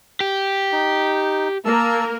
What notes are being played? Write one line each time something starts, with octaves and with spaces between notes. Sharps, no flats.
G4
D#4
A#3 A#4 A5 E6